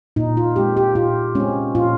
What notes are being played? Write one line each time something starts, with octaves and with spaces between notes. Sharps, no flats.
A#2 D#4
F4
G#3 C4 G4
G4
A#2 F4
G#3 C4 C#4
A#2 F4